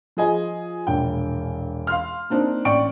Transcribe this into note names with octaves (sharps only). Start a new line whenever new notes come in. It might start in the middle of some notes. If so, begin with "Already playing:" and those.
F3 F4 G#4 D#5 G#5
E1 A#1 G5
F5 C6 F6
A#3 C4 D4 D#4
A1 D5 G5 C#6 D7